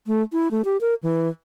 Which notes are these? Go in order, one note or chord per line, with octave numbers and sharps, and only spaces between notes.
A3
E4
A3
G4
A#4
E3